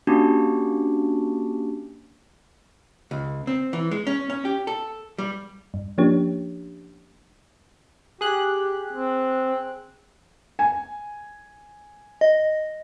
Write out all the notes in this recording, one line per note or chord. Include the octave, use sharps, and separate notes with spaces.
A#3 C#4 D4 F#4 G4
C#2
C4
E3
G#3
C#4
C#4
G4
A4
G3
G2
F3 A#3 C#4 D4 G4 C#5
G4 G#4 F#6
C4
G#5
D#5